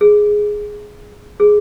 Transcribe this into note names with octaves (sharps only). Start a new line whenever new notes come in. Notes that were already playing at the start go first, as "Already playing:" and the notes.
G#4
G#4